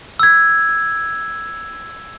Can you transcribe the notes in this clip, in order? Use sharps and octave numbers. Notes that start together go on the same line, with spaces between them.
E6 G#6